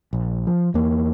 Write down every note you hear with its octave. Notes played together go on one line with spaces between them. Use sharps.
A#1
F3
E2 A#3